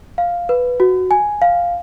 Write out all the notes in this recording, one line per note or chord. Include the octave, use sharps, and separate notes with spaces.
F5
B4
F#4
G#5
F5